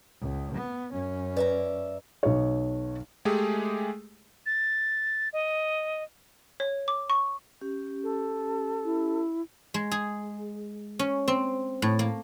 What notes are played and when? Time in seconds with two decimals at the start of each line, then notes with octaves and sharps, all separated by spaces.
0.20 C#2
0.54 B3
0.91 F#2 C#4
1.37 B4 D5 E5 A#5
2.23 B1 C#5
3.25 G#3 A3 G4 G#4
4.46 A6
5.33 D#5
6.60 C#5
6.88 D6
7.10 C#6
7.61 C#4 G4
8.03 A4
8.85 E4
9.74 G#3
9.91 G#4
10.99 C#4
11.28 C4
11.82 A2
11.99 A#3